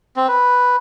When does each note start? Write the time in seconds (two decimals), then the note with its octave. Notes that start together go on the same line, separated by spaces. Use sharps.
0.16 C4
0.28 B4